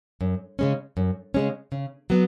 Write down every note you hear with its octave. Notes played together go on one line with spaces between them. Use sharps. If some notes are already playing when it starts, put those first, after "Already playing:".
F#2
C#3 G#3 C#4
F#2
C#3 G#3 C#4
C#3
F#3 B3